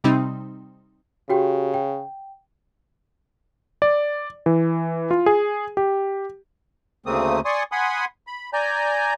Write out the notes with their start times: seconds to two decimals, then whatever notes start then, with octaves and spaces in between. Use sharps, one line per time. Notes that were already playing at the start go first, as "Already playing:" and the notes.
0.04 C3 G3 C4 D#4
1.30 C#3 F#4 G4 G5
1.74 G5
3.82 D5
4.46 E3
5.11 F4
5.26 G#4
5.77 G4
7.06 D2 C#3 A3 A#3 C4 D#6
7.45 D5 G#5 C6 C#6 D#6
7.72 F#5 G#5 B5 C6 D#6
8.27 B5
8.53 D5 G#5 A#5 G6